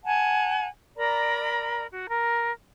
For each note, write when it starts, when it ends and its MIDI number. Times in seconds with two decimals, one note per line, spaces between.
0.05 0.67 78
0.05 0.67 80
0.05 0.67 81
0.97 1.85 70
0.97 1.85 74
0.97 1.85 82
0.97 1.85 83
1.92 2.07 66
2.10 2.51 70